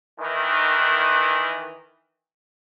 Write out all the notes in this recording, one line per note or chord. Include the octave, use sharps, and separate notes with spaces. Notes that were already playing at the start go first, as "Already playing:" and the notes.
D#3 E3